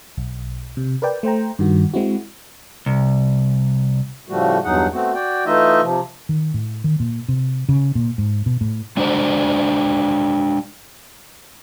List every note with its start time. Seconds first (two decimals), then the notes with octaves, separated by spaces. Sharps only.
0.17 B1
0.77 C3
1.02 A#4 B4 D5 G5
1.23 A3 C5 G5 A#5
1.59 G2 D#3 F#4
1.94 G#3 C4 E4 F#4
2.86 C2
4.29 A2 C#3 F3 G3 A3 F#4
4.65 E2 G2 F#3 D#4 G#4 F#5
4.93 A3 B3 C4 F#4
5.14 F#4 D5 G5
5.46 E3 A3 D#4 F4 D#5 E5
5.82 C3 F3
6.29 D#3
6.54 A2
6.84 D#3
7.00 A#2
7.28 C3
7.69 C#3
7.95 A#2
8.18 G#2
8.46 B2
8.61 A2
8.97 G#3 D4 F#4 C5 D5